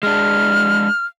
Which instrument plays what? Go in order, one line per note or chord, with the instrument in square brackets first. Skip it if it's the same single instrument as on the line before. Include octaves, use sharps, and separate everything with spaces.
[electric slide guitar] G#3 D4 [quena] F6